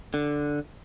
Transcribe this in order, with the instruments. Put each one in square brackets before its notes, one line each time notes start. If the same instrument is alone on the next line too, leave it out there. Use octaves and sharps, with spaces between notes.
[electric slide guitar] D3